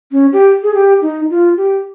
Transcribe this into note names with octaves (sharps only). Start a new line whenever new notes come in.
C#4
G4
G#4
G4
D#4
F4
G4